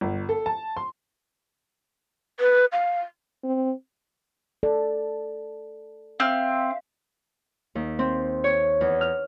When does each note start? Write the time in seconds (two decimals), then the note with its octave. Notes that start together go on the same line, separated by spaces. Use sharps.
0.01 G1
0.29 A4
0.46 A5
0.77 C6
2.40 B4
2.72 F5
3.43 C4
4.63 A4 D5
6.20 C4 E5 F5 F6
7.75 D#2
7.99 C4
8.44 C#5
8.81 E2
9.01 F6